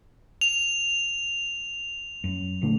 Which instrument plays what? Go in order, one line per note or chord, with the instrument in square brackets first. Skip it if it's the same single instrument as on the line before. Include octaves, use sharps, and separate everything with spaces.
[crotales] F7
[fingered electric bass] F#2
A#1 D3 A3